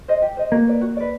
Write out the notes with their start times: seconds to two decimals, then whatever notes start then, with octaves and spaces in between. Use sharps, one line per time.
0.08 C5 D#5
0.22 G4
0.37 C5 D#5
0.52 A#3 F#4
0.67 B4 D5
0.81 F#4
0.97 B4 D5